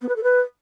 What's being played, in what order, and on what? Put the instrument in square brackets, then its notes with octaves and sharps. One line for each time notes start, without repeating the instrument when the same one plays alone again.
[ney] B3
B4
A4
B4